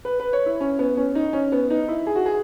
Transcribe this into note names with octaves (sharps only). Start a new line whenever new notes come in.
B4
B4
C#5
E4
C#4
B3
C#4
D#4
C#4
B3
D#4
E4
G#4
F#4
G#4